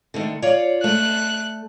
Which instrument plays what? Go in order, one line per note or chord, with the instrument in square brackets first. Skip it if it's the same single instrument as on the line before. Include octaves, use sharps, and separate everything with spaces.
[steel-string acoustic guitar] D3 D#3 A3
F4 C#5 D5
[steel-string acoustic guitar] A3 [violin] F#6